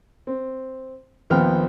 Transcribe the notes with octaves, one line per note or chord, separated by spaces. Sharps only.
C4
A#1 D#2 B3 C4 G5 F6